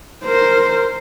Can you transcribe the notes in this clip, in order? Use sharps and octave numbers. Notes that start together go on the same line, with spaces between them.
A#4 C5